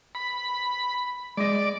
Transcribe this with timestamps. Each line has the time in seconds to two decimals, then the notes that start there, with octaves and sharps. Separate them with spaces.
0.15 B5
1.37 G#3 D5 D#5